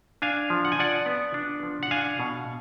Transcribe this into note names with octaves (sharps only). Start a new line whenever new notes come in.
D4 F5 G#5
F3
F#5
G#5
F3 D5 F#5
B3
D4
F3
F#5
D4 F5 G#5
B2